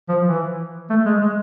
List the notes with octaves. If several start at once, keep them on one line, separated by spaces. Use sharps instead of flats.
F3
E3
A3
G#3
G#3